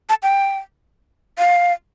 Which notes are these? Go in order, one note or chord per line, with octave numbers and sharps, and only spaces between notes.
A5
G5
F5